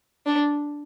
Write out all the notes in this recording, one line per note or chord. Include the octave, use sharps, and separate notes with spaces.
D4